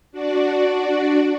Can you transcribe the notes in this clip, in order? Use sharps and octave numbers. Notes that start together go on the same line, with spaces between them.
D4 F#4 D5